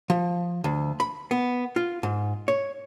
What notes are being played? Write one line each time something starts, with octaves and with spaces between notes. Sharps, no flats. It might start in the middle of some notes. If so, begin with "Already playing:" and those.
F3
D2
B5
B3
F4
G#2
C#5